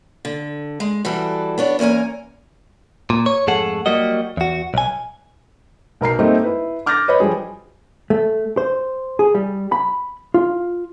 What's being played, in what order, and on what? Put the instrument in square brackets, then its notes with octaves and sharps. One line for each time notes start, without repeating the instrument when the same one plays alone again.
[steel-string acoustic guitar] D3
G#3
E3 G3 F#4 A4
B3 D4 C#5
E2 A#3 C#4 G#5 A#5
[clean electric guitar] A#2
C#5
F2 G#2 A3 G#4 A4 F#5
F#3 G3 A#3 F#4 D#5
E2 F#4
B1 G#5
[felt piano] B1 A#4 A#5 C7
G3 A3 A#3 C4 D#4 G4
E4 B4
D6 F6 G6 A6 A#6
B4 C#5 D#5 B5
F3 G3 G#4
[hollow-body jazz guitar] A3
C5
G#4
G3
B5
F4